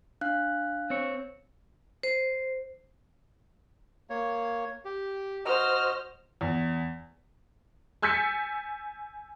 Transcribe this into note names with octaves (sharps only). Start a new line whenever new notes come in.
D4 F5 F#6
C4 C#5
C5
A#3 C#5
G4
F#4 C5 D#5 F6
E2
G#5 E6 G6 A6 B6 C#7